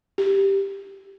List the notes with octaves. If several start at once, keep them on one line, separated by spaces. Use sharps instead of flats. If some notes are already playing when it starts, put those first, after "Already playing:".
G4